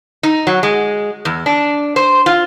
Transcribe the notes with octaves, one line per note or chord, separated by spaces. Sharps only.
D#4
F#3
G#3
E2
D4
C5
F4